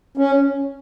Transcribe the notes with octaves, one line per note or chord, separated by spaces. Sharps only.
C#4